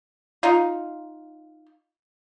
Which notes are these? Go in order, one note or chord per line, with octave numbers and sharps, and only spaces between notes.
D#4 F4